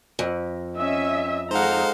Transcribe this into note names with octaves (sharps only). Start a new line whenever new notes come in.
F2
C#4 D#5 E5
G#3 D#4 A4 C5 F5 F#5 A#5